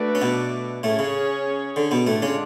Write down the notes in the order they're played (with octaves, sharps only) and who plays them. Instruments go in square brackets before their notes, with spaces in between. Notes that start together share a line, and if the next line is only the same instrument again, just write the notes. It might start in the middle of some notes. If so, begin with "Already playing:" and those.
Already playing: [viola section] A3 D4 F#4 B4 D5
[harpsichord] C#4
B2 B3
[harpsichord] A2 A3 [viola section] C#4 G#4 C#5
[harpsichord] C#3
D3
B2 B3
[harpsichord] A2 A3 [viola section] D3 G#3 D4 F4
[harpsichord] C#3 C#4